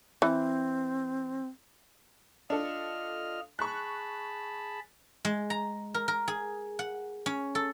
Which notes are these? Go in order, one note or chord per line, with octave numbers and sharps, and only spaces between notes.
E3 C4
D4 F4 A4 D#5 F6
G#4 A5 B5 C#6 F#6
G#3
A#5
A#4
A#4
G#4
F#5
C#4
A4